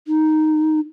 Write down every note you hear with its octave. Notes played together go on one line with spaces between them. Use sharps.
D#4